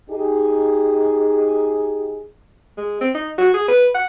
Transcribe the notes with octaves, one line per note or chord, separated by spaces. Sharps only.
D#4 G4 G#4
G#3
C4
D#4
F#4
G#4
B4
F#5